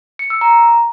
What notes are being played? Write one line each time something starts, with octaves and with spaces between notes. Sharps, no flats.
C#7
E6
A#5